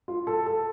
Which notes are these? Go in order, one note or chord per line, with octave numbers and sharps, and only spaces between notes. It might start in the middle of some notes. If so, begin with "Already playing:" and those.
F4
A4
A4